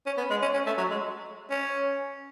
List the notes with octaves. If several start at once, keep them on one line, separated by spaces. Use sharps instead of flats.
C#4
B3
G#3
C#4
C#4
A3
F#3
G#3
C#4